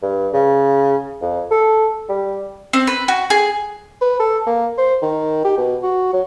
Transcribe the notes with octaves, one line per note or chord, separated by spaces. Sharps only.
G2
C#3
F2
A4
G3
C4
B4
F#4
G#4
B4
A4
A#3
C5
D#3
G4
B2
F#4
F#3